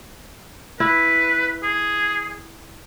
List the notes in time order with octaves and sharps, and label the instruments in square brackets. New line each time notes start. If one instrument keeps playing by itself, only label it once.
[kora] E4 [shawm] B4
[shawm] G#4